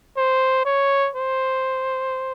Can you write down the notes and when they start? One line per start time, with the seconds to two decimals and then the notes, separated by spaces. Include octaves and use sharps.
0.17 C5
0.65 C#5
1.15 C5